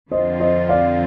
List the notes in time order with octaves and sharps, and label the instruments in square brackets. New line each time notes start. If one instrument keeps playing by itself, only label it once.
[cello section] F2 D3 F3 C4 F4 [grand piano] C5 D#5
[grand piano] C5 D#5
D5 F5